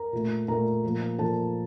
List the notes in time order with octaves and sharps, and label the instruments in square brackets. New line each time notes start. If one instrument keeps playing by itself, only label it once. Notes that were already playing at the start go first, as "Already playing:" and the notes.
Already playing: [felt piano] A#4 A#5
A#2 A3
A#2 A3 A#4 A#5
A#2 F3 A#3
A#2 F3 A#3 A4 A5